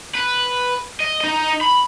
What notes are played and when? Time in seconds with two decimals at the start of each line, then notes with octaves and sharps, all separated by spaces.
0.15 B4
1.00 D#5
1.21 D#4 D#5
1.61 B5